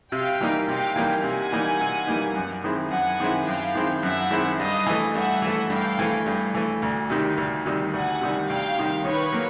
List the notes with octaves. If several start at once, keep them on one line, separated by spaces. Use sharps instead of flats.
C3 F5 G5
E3 G3 A#3 D#4
C3 F5 G5
E3 G3 A#3 D#4
C3 F#5 G#5
E3 G3 A#3 D#4
C3
E3 G3 A#3 D#4
F#2
D#3 G#3 C4 E4
F#2 F#5 G#5
D#3 G#3 C4 E4
F#2 F5 G5
D#3 G#3 C4 E4
F#2 E5 F#5
D#3 G#3 C4 E4
G2 D#5 F5
E3 A3
G2 E5 F#5
E3
A3
G2 F5 G5
E3 A3
G2
E3 A3
D2
C3 D#3 G3
D2
C3 D#3 G3
D2 F#5 G#5
C3 D#3 G3
D2 F5 G5
C3 D#3 G3
D#3 B4 C#5
F#3 A#3